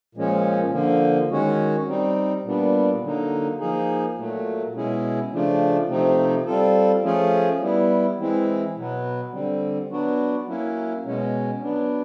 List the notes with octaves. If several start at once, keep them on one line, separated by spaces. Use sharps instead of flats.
A#2 F3 G#3 C#4
D3 F3 A#3
D#3 G#3 C#4 F#4
G3 C4 D#4
A#2 G3 B3 D4
D3 F#3 A#3 D#4
F3 A#3 D#4 G#4
A#2 F#3 A3
B2 G#3 C#4 E4 G#4
C#3 F3 A3 D4 F4
C3 F3 A3 C4 D#4
G3 C4 F4 A4
F3 A3 C#4 F4 G#4
G3 B3 E4
E3 G#3 C4 E4
B2 F#3 B3
D3 G3 C4
F#3 B3 D4 F#4
F#3 A#3 C#4 E4
B2 G#3 C#4
F#3 B3 D4